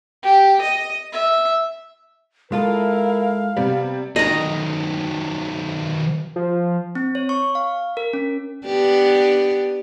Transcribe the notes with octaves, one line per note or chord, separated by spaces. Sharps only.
G4
D#5
E5
G#3 E4 F4 A4 A#4 F5
C3 G3 B3
D#3 F#3 D#5 A#5
F3
C4
C#5
C#6
F5
A#4
C#4
B3 D4 G4